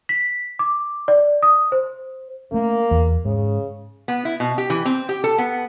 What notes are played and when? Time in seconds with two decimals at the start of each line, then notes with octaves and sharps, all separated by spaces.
0.09 B6
0.59 D6
1.08 D5
1.43 D#6
1.72 C5
2.52 A3 A#3 C#4
2.91 E2
3.25 G#2 C#3
4.08 B3
4.25 E4
4.40 B2
4.58 G4
4.70 E3
4.85 C4
5.09 G4
5.24 A4
5.38 B3